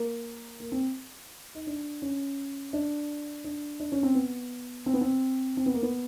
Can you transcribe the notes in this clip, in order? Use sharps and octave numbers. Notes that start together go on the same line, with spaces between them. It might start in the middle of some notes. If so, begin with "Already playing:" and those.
Already playing: A#3
A#3
C4
D#4
D4
C#4
D4
D4
D4
C#4
C4
B3
C4
B3
C4
C4
B3
A#3
B3